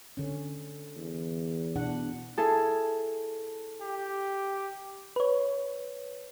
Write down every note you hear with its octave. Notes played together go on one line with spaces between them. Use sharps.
D3 C#4
E2
B2 D4 F#5
E4 G#4 A4
G4
B4 C#5